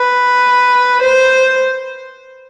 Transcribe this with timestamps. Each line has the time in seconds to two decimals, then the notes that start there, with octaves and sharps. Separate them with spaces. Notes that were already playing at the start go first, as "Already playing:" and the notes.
Already playing: B4
1.02 C5